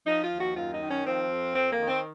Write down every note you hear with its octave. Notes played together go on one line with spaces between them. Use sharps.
F3 D#4
F4
D#2
F#4
F#2 F4
D#4
D#3
C#4
F3 C4
F2
F2 C4
A#3
D#3
C4